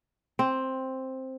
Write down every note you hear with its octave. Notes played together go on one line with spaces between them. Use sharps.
C4